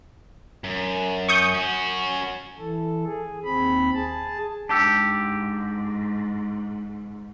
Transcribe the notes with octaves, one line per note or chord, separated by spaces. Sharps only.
F#2
C#6 D#6 G6
C#4 F#4
E3 A4
G#4
D#2 C4 B5
G#4 A5
G#2 D4 G4 A5 E6 C#7